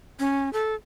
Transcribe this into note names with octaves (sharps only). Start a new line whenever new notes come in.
C#4
A4